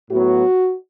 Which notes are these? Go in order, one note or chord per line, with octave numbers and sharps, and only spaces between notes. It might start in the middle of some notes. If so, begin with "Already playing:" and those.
A2 F#3 B3 F#4